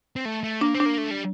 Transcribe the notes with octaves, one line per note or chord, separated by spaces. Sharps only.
C4
A3
A3
A#3 D4
C4
D4
A#3
A3
G3